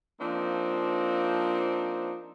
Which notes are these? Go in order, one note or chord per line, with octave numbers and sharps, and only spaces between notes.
F3 A#3 C4 D4 D#4